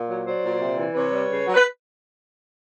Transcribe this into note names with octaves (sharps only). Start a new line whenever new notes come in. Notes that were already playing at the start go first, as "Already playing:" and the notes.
Already playing: A#2
F#3
F#3 C5 D5
A#2
C3
E3
C3 B4 C#5
G3
C#3
F#3
B4